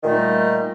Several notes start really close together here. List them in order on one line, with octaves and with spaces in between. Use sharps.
D#3 A#2 A3 D#4 G3